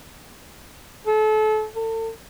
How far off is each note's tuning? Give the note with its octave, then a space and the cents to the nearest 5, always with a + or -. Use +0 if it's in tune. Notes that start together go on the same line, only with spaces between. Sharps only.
A4 -30
A4 +35